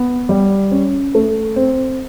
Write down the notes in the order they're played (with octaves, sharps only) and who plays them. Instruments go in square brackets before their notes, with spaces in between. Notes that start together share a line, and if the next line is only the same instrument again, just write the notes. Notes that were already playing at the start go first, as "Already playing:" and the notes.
Already playing: [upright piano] B3
G3
C#4
A3
C4